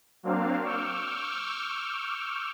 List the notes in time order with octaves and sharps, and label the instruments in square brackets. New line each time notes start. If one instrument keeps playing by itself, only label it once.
[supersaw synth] F#3 A#3 C4 D4 F5
C#6 D6 E6 F6 G6